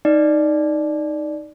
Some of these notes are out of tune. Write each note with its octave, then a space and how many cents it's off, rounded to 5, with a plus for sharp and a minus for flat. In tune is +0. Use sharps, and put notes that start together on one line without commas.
D#4 +0 D5 +0